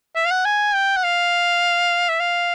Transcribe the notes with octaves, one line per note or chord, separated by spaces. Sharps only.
E5
F5
F#5
G#5
G5
F#5
F5
E5
F5